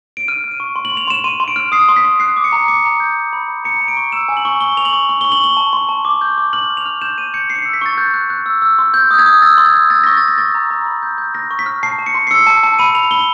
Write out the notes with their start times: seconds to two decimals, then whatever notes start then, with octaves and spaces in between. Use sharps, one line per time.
0.17 D7
0.28 F6 D#7
0.44 F6
0.51 D#7
0.60 C#6
0.76 C6
0.85 F#7
0.92 C6
0.97 F7
1.08 C6 E7
1.24 C6 D#7
1.40 C6
1.48 D7
1.56 F6
1.72 D#6 C7
1.89 C6
1.96 B6
2.04 C6
2.20 F#6 C7
2.37 D6
2.44 C#7
2.52 A#5
2.68 D6 C#7
2.85 A#5
3.00 G6
3.16 D#6
3.33 B5
3.48 B5
3.64 A#5 C#7
3.81 A#5
3.88 D7
3.97 C#6
4.12 E6 E7
4.29 G#5
4.37 F#7
4.45 C#6
4.61 C#6 G7
4.77 C#6 F7
4.85 F#7
4.93 C#6
5.09 C#6
5.21 C#6 G7
5.32 F#7
5.40 C#6 G7
5.57 A5
5.73 C6
5.89 A5
6.05 D6
6.21 G6
6.38 D6
6.53 F6 F#7
6.70 F6
6.77 F7
6.86 F6
7.01 G6 E7
7.18 G6 D#7
7.34 G6 C#7
7.49 C#6 C7
7.55 C#7
7.62 E6 C7
7.74 B6
7.82 C#6 A6
7.97 F#6 G6
8.14 F#6
8.30 F#6
8.46 E6
8.62 E6
8.79 C6
8.94 G6
9.11 D#6 G6
9.19 G#6
9.26 D#6
9.42 E6 A6
9.58 C6
9.66 G#6
9.74 E6
9.90 E6 A6
10.04 C#6 A#6
10.17 A6
10.22 C#6
10.28 A#6
10.38 C#6 A6
10.55 A#5
10.71 A#5
10.86 B5
11.02 G6
11.18 G6
11.35 F6 A#6
11.51 C#6
11.59 B6
11.66 F6
11.83 A5 C7
11.99 A5
12.06 C#7
12.14 C6
12.27 C7
12.31 E6 C#7
12.47 A5
12.63 A5
12.79 B5 D#7
12.95 B5 F7
13.11 B5 G7